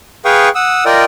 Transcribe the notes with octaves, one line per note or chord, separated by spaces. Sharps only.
G#4 B4 F5 G5 C#6 D#6
F#5 D#6 E6
F4 A#4 D5 D#5 G5 D#6